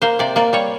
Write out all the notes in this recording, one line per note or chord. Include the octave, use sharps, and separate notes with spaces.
A#3 C5
C3 D5
A#3 D5
G3 C#5